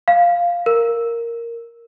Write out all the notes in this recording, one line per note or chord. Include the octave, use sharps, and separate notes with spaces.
F5
A#4